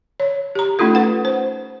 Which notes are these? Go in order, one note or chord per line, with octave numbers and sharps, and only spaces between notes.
C#5
G4 A#5
A3 C#4 D#4 F4 A4
B4 F#5
C5